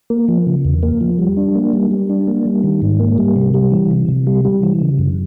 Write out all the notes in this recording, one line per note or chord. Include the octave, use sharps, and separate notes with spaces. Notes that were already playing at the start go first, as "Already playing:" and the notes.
A#3
F3
C#3
E2
A#3
F3
G3
D4
A#3
G3
G3
D4
A#3
G3
D#3
G#2
A#3
G3
C3
G3
E3
C3
C3
G3
G3
E3
C#3
F#2